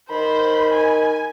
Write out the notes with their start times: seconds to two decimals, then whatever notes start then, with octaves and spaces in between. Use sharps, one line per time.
0.10 D#3 C5 B5
0.72 G#5